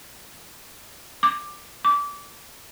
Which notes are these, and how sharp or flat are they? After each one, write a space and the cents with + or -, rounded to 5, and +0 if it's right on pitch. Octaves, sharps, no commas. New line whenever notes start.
D6 +10
D6 -25